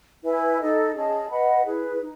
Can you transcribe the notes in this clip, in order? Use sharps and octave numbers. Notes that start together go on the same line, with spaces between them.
E4 B4 E5 G#5
D#4 A4 D#5
C#4 G#4 D#5 A5
B4 D#5 F#5 B5
E4 G#4 B4
D#4